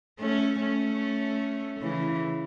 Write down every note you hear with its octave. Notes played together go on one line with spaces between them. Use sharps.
A3 C#4
A3 C#4
C#3 E3